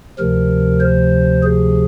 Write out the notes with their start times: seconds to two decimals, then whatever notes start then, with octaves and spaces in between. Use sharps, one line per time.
0.19 D2 C3 F3 A#4
0.81 C5
1.43 G#4